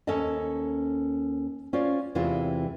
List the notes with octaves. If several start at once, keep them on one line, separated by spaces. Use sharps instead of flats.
D#2 C#4 A4 C5 D#5 A5
C#4 F4 C5 D5
E2 C3 E3 G#3 C4 F4